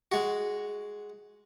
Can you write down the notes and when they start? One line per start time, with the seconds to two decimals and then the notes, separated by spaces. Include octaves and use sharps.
0.12 G#3 F#4